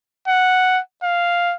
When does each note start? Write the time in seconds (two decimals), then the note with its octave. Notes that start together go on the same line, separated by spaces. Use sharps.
0.28 F#5
1.03 F5